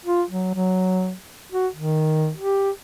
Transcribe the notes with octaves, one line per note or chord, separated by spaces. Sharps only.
F4
F#3
F#3
F#4
D#3
G4